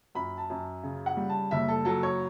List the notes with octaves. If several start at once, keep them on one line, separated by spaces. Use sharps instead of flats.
F#2 B5
A5
F#2
C#3
F#5
G3
A5
F#1 E5
A4
F#3 A4
C#5